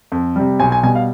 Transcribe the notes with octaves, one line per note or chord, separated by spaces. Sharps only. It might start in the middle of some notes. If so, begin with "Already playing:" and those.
F2
C3 G3
B1 G#5
G#5
B2 G3 G#5
F5